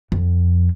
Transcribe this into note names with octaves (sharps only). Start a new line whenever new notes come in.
F2